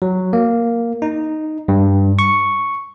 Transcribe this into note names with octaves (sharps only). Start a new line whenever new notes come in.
F#3
A#3
D#4
G2
C#6